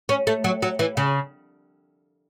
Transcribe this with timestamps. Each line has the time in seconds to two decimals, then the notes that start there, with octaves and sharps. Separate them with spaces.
0.09 C#4
0.27 A3
0.44 F#3
0.62 F#3
0.79 E3
0.97 C#3